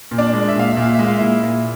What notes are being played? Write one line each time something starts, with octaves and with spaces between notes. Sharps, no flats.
A#2
D4 D5
G#3
E5
A#2 F5
E5
A#2
F5
G#3 E5
F5
A#2 E4 E5
A#2